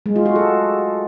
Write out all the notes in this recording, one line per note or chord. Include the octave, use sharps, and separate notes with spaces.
G#3
F4
F#4
A4